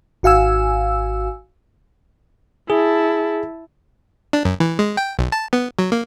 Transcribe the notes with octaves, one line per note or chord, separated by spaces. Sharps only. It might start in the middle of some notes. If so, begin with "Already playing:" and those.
G#1 F#4 F5 G#5 E6
E4 G#4 A5
D4
F#2
E3
G#3
G5
B1
A5
B3
F#3
A#3